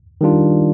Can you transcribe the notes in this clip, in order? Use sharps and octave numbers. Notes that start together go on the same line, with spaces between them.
D#3 G3 D4 F4